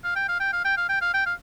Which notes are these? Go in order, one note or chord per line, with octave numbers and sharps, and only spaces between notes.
F5
G5
F5
G5
F5
G5
F5
G5
F5
G5
F5